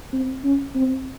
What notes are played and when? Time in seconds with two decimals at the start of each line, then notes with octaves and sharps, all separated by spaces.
0.13 C4
0.44 C#4
0.75 C4